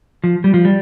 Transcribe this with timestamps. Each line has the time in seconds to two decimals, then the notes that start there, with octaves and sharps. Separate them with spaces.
0.24 F3
0.44 G3
0.54 F3
0.65 G3